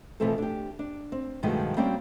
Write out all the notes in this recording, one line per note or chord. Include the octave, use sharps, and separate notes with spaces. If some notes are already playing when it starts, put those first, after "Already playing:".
B2 E3 F3 A3 C4 A4
D4 G4
D4
C4
G2 B2 D#3 F3 G#3 A3
G3 A#3 C4 C#4 F#4 D5